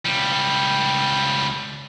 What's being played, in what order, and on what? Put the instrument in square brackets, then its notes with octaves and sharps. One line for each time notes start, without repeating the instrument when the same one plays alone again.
[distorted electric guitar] C#2 G3